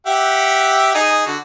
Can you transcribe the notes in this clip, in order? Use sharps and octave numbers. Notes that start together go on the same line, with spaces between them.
G4 E5 F#5
D#4 G#4
D3 F#4